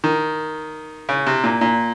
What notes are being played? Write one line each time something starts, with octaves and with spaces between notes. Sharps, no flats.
D#3
C#3
C3
A#2
A#2